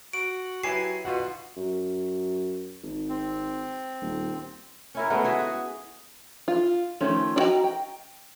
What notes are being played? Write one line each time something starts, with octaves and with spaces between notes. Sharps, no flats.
F#4 D7
F#3 E4 G4 B4 G#5 C7 E7
B2 F4 F#4 F#5
F#2
G#1
C4
D#1
C#4 E4 A#4
G#3 A3 B3 F#4
F#4 G#4 E5
F#4
F4
D#3 F3 A3 C#4
D4 F#4 D#5 G5 A#5
G5